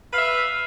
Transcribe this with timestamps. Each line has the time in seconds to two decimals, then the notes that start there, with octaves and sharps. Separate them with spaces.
0.12 B4
0.14 F5
0.17 E5